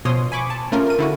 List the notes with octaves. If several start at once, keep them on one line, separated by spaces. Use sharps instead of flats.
B2 F3 C#5 C6 D#6
G#5 B5 C#6 D6
A5
A3 C#4 F4 A#4
A#4 D#7
D3 E4 F#4